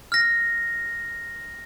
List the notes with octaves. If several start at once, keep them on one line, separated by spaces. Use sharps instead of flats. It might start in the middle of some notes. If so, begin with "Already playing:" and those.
F6 A#6